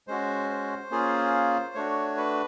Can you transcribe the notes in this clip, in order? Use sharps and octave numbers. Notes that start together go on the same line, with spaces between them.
G#3 C#4 F#4 C5
C5
A#3 C#4 F4 G#4
A3 D4 F#4 C#5
B4